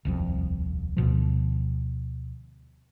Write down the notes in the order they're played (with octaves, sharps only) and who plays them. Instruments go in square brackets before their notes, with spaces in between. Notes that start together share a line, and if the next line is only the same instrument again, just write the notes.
[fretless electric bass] D#1 C2 F2
D2 B2 F3